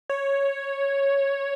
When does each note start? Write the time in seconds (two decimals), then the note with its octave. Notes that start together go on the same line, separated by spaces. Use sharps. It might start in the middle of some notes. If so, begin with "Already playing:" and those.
0.09 C#5